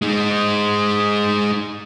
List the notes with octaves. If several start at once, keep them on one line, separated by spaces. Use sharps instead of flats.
G#3 D#4